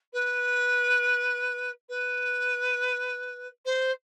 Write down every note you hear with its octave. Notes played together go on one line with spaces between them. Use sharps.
B4
B4
C5